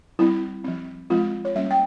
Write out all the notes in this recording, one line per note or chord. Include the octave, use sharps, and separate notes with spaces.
G3 C4 E4
F3 C4
F3 G#3 C4 F4
C#5
G3 A#3 C#4 E5
G5